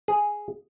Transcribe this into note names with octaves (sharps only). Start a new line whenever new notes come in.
G#4